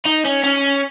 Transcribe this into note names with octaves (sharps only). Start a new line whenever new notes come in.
D#4
C#4
C#4